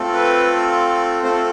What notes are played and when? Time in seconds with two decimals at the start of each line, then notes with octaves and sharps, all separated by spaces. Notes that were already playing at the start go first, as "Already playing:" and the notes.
Already playing: A3 C4 F4 A4
0.14 B4
1.23 A3 C4 F4 A4 C5